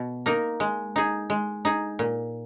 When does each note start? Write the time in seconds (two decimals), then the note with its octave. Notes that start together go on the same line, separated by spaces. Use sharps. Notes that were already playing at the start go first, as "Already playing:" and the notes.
Already playing: B2
0.26 A#3 D#4 A#4
0.60 G#3
0.96 D#4 G#4
1.30 G#3
1.65 D#4 G#4
1.99 A#2